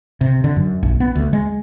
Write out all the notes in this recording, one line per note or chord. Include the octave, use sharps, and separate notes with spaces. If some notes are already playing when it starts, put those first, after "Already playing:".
C3
D3
F#2
A#1
B3
D2
G#3